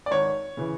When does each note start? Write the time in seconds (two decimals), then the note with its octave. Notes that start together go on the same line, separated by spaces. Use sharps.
0.06 D5
0.11 G#1 C#5
0.57 C#3 E3